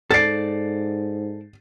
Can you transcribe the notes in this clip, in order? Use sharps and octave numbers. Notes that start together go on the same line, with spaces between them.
G#2 A4 D5 A6 C7